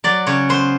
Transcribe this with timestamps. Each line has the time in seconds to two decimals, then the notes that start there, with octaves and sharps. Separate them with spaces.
0.04 F#3 D5
0.26 C#3 C#5
0.49 B3 C5